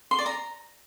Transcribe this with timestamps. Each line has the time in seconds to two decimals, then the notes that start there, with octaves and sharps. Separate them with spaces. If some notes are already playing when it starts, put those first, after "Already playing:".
0.11 C6
0.19 D5
0.26 A#5